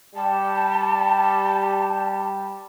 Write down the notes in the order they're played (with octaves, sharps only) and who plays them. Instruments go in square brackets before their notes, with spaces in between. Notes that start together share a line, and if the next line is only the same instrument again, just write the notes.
[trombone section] G3 [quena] A5